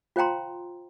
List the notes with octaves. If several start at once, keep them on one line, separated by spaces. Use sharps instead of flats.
F4 C5 F5 G5 A#5 C6